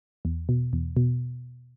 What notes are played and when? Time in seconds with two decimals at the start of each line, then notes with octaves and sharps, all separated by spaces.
0.25 E2
0.49 B2
0.73 E2
0.97 B2